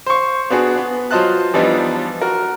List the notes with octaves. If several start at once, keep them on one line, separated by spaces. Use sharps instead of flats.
C5 C#6
B3 D4 F#4 G#4
B3
F#3 F4 C5 D#5 A5 F#6
E3 F3 G3 B3 D4 D#4
F#4 A#4